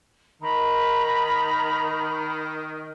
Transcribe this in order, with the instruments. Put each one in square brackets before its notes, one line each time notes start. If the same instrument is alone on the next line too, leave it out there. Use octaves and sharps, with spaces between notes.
[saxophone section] D#3 [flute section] A#5 B5